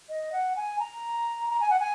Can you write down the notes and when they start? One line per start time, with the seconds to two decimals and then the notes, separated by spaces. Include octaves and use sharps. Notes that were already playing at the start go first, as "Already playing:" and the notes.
0.09 D#5
0.33 F#5
0.56 G#5
0.79 A#5
1.50 A#5
1.60 G#5
1.70 F#5
1.80 G#5